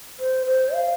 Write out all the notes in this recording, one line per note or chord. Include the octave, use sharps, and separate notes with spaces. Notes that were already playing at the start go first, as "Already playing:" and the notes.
C5
C5
F5